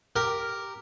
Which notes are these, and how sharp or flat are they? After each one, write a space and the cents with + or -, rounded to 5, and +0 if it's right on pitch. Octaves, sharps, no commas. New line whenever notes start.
G4 +0 A#4 -5